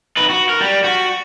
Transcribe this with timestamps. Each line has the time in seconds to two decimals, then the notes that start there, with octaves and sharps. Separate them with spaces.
0.17 D#4 B4
0.30 F#4
0.49 A#4
0.61 G3
0.84 F#4